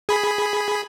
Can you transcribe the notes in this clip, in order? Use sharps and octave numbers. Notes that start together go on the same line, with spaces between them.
G#4 B5